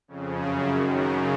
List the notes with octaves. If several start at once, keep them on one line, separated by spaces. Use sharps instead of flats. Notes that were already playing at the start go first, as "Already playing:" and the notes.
F2 C#3
F#2 C#3 G#4
F#2 D#3 F#4
F#2 C#3 A#4